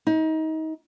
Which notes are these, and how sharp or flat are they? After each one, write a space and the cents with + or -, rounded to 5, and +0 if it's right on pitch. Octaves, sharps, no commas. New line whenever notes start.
D#4 +30